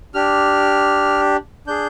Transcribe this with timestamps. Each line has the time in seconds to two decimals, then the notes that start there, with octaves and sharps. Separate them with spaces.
0.14 D4 G4 F6
1.67 D4 G#4 G6